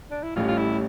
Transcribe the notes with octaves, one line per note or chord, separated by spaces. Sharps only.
D4
E4
A1 A2 G3 F4
F4
E4